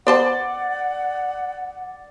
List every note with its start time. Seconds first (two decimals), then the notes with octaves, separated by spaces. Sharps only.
0.07 B3 C5 D5 F#5 A5